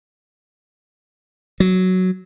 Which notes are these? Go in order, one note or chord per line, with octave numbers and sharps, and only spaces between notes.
F#3